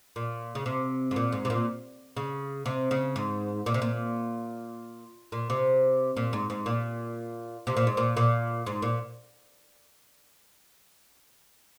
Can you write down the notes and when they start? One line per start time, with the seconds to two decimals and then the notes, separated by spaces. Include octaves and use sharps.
0.16 A#2
0.55 C#3
0.66 C3
1.11 G#2
1.16 A#2
1.32 G#2
1.45 C3
1.50 A#2
2.17 C#3
2.66 C3
2.91 C#3
3.16 G#2
3.66 A#2
3.74 C3
3.82 A#2
5.32 A#2
5.50 C3
6.17 A#2
6.33 G#2
6.50 G#2
6.66 A#2
7.67 C3
7.77 A#2
7.87 G#2
7.97 A#2
8.17 A#2
8.66 G#2
8.82 A#2